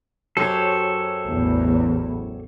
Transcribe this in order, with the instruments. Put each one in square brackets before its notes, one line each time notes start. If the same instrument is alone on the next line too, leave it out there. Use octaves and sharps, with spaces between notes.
[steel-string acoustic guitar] F#2 F#3 G4 [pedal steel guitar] A4 C5 C#5
[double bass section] A1 E2